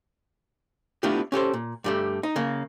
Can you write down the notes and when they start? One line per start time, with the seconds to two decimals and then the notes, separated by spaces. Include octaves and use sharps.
1.03 A3 B3 D4 E4 F4 G4
1.32 C#4 G4 A4 C5
1.53 A#2
1.84 G2 G3 A3
2.23 D#4
2.36 C#3 A#3